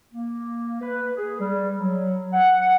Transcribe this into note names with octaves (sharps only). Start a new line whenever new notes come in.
A#3
B4
G#4
G3
F#3
F#5